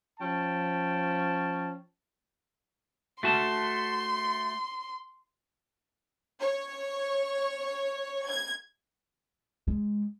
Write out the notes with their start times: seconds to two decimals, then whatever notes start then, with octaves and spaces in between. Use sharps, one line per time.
0.20 F3 C#4 G5 A5
3.23 A3 F#4 A5 C6
6.38 C#5
8.25 G#6
9.68 G#3